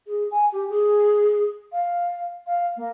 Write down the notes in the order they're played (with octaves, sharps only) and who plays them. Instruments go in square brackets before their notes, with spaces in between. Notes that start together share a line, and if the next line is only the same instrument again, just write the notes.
[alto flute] G#4
G#5
G4
G#4
F5
F5
A#3